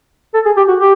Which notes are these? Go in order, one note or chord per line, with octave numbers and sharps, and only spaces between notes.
A4
G#4
G4
F#4
G4